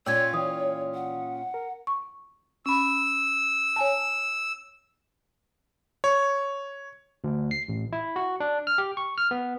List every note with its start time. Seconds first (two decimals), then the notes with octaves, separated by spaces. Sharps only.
0.06 A#2 C#4 F4 C#5 D5 G5 E6 G#6
0.34 E3 D5 G5 D#6
0.94 F#5
1.54 A#4
1.87 C#6
2.66 C#4 B5 E6
3.76 C#5 G#5 A5
6.04 C#5
7.24 D2
7.51 C7
7.68 A1
7.93 E4
8.16 F#4
8.40 D4
8.67 F6
8.78 G4
8.97 C#6
9.18 F6
9.31 B3